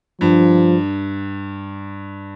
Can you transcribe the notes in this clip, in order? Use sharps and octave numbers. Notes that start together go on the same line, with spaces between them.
G2 F3